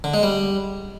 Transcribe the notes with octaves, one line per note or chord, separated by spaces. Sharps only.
D3
G#3
G3